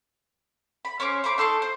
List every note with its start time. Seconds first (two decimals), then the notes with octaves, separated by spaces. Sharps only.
0.85 B5
1.00 C#4 C5 C#5 D6
1.24 C5 A#5 B5 D6
1.38 D#4 A4 C6 C#6
1.62 C5